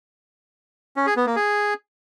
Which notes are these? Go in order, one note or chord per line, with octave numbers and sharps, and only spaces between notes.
C#4
G#4
B3
A#3
G#4